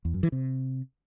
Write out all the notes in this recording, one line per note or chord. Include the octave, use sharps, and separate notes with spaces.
E2
F#2
E3
C3